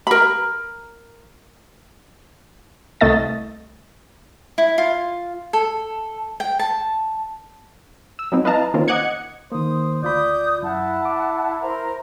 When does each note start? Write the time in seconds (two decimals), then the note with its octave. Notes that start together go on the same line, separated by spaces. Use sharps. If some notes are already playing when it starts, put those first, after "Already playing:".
0.07 A#4 B5
3.01 C2 A3 D#5 A6
4.58 E4
4.78 F4
5.53 A4
6.40 G5
6.59 A5
8.19 E6
8.32 F#3 G#3 B3 C4 D#4
8.44 E4 B4 D#5 F5 A5 A#5
8.74 D#3 A#3 C4 C#4 F4 A#4
8.88 D#5 F#5 D6 F#6 G#6 C#7
9.52 D#3 A#3 C5 D#6
10.03 D2 F4 D5 B5 D#6 G6
10.63 F#2 E4 F#5 A5
11.05 D6
11.61 A#4 C5 A#5